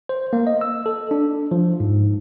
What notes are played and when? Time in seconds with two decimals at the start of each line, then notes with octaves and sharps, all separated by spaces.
0.09 C5
0.33 A#3
0.47 D#5
0.61 E6
0.86 A4
1.11 D4
1.51 F3
1.80 G#2